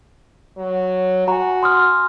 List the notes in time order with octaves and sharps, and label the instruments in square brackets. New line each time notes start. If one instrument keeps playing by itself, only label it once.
[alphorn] F#3
[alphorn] F#4 [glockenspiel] G#5 A#5
[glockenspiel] C6 D#6 F6